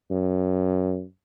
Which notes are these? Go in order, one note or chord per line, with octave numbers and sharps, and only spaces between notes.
F#2